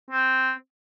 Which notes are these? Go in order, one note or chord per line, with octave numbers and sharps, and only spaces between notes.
C4